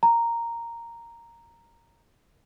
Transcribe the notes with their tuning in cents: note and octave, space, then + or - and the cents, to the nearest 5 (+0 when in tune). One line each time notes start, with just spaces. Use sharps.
A#5 -5